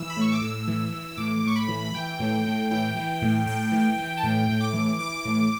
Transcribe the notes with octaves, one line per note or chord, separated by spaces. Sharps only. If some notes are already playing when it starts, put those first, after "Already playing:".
Already playing: E3 E6
B5
A2 C#6
D6
A2 E6
E3
E3
A2 D6
A2 C#6
B5
E3
E3 G5
A2
A2
E3 G5
E3
A2
A2 G5
E3
E3
A5
A2 G5
A2
D6
E3
E3 D6
A2